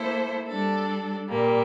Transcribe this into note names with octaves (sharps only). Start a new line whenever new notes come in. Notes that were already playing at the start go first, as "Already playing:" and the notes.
Already playing: A#3 E4 A4 C5
G3 D4 A4
A#2 G3 A#3